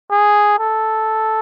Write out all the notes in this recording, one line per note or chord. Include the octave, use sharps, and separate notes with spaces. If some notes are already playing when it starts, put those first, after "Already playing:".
G#4
A4